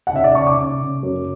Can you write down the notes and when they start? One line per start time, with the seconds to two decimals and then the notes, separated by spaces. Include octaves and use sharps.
0.07 F#5
0.13 C#3 E5
0.24 D5
0.35 C#3 C#6
0.47 D6
0.58 C#3
0.81 C#3
1.03 F#2